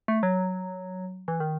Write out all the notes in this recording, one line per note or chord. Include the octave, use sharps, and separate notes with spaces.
A3
F#3
E3
D#3